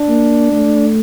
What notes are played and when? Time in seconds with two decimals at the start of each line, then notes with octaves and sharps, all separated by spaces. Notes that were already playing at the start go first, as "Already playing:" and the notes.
Already playing: D4
0.08 A#3
0.52 A3